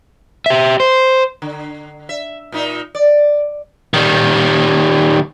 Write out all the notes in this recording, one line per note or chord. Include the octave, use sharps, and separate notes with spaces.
G4 E5
C5
D3
E5
A#2 D#4 E5
D5
D#3 G3